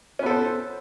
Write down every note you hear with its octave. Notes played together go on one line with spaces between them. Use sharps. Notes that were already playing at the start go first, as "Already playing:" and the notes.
B3 C#4 A4 C5